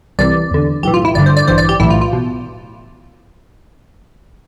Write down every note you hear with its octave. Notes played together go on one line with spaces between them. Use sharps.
C2 C3 E3 D5
E2 D3
B1 A2 E3 G4
F4
E4
G1 G2 D3 D5
C5
D5
A1 G2 E3 C5
D5
G4
B1 A2 E3 E4
F4
F4
B2